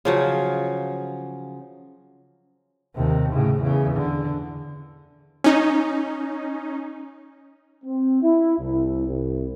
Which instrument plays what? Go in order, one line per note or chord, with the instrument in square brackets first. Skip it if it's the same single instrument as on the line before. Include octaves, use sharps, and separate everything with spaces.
[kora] C#3 F3 F#3
[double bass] D#2 C3
A2 C#3
E2 C#3
D3
[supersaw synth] C#4 D#4
[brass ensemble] C4
E4
C2
C2